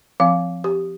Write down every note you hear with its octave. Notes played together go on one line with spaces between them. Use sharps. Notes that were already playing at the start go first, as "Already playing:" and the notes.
F3 C4 F5
G4